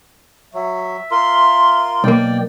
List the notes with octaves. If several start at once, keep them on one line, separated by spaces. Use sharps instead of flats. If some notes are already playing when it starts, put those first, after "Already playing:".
F#3 E5
F4 A#4 C6
B1 A#3 D5 G5